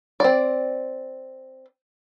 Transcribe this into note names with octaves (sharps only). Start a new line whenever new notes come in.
C4 D5